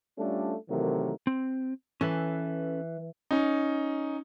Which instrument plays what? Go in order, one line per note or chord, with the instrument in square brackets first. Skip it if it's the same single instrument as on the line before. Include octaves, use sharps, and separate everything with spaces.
[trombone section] G3 A3 C#4 D4 F4 A4
C3 D#3 E3 F#3 A3 A#4
[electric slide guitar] C4
[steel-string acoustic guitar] E3 [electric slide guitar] C#4 A4 B4
[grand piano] C#4 D#4